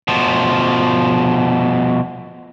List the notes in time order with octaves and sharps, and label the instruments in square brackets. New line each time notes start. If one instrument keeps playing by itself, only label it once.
[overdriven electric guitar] B2 F3